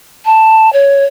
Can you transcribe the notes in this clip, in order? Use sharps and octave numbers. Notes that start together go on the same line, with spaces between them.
A5
C#5